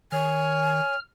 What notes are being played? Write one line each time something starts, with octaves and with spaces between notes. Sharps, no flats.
D#3 C#5 G#5 F6